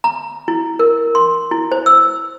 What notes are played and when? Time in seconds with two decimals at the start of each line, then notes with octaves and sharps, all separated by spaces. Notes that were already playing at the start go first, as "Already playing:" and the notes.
0.04 A#5
0.48 E4
0.79 A#4
1.15 C6
1.51 E4
1.72 C5
1.86 E6